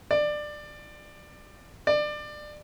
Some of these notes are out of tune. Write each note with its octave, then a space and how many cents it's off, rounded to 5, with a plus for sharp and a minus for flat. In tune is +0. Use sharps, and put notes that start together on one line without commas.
D5 +20
D5 +25